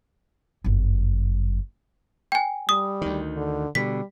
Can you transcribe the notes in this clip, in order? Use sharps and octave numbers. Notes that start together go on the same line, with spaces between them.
G1 F#2
G5 G#5
G3 D#6
D2 D#3
D3
B2 D3 G3 B6